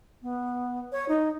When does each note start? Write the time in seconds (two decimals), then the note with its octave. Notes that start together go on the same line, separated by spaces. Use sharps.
0.22 B3
0.92 C#5
1.08 D#4